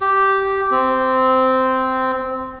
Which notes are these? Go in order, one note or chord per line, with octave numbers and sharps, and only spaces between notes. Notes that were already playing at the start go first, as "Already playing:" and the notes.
G4
C4